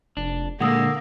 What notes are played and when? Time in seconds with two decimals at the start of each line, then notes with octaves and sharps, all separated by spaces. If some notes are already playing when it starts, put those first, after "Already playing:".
0.17 F1 D4
0.60 A#2 D3 G#3 A#3 F#5 D#6 E6